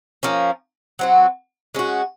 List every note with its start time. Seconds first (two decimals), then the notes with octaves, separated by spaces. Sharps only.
0.23 F3 A#3 C#4
0.99 F#3 C4 F#4
1.75 G#3 C#4 F#4